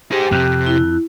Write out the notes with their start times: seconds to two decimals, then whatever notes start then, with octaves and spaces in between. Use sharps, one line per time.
0.12 G4 G#4 C5
0.32 F2 C3 C4
0.66 E4